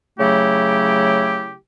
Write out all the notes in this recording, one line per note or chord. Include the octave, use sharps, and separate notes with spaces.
C#3 F#3 A3 E4 G4